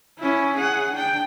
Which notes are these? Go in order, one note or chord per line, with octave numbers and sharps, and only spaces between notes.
C#4 E4
G#4 F#5
D4 G5